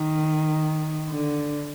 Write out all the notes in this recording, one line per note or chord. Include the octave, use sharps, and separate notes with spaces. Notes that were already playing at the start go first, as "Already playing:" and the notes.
Already playing: D#3
D3